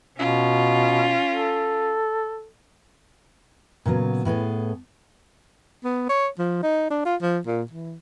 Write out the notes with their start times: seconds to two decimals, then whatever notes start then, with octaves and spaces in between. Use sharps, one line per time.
0.17 B2 C#4 F4
1.29 A4
3.86 A#2 C#3 F#3 B3
4.25 A2 B3 G#4 A4
5.84 B3
6.09 C#5
6.39 F3
6.63 D#4
6.90 D4
7.05 F4
7.22 F3
7.47 A#2
7.71 E3